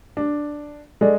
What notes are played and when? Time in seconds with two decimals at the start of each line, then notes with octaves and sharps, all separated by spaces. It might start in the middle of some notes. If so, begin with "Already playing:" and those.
0.17 D4
1.01 G#3 A4 D5